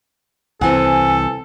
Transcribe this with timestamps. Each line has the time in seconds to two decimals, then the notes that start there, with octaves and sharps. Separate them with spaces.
0.61 C2 E3 C4 A4 F#5 G#5